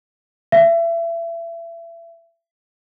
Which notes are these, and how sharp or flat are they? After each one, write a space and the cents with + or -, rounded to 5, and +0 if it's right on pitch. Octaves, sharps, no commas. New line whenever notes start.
E5 +30